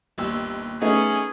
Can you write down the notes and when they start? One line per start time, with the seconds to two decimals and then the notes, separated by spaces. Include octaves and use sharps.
0.18 G1 D#2 E6
0.81 A3 B3 C#4 D#4 G#4